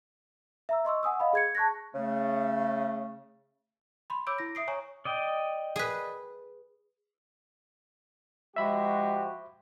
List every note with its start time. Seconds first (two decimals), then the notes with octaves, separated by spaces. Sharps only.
0.69 E5 A#5 E6
0.85 D#5 C6 C#6 E6
1.03 F#5 G#5 D#6 E6
1.20 D#5 F5 B5
1.33 G#4 G#6 C#7
1.55 A5 C#6 F#6 G#6 A#6
1.95 C#3 A3
4.10 B5 C6
4.27 C#5 B5 D6 E6 G6 D7
4.38 E4 A#6
4.55 E5 D#6 C7 D7
4.68 C#5 G#5 A#5 C#6
5.05 D5 D#5 G5
5.76 G#4 B4
8.56 F3 G#3 F#4 G4 E5 B5